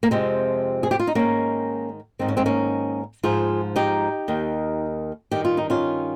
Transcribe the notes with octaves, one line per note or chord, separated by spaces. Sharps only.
A#3
F2 C3 F3 G#3 C4
G#4
G4
F4
D#4
G#2 D#3 A#3 C#4
G#2 D#3 C4
C#4
G#3 C4
A#3 C#4
G#2 F3 F4 G#4
D#4 G4
D#2 D#3
G2 D#3 G4
F4
D#4
C#4 F4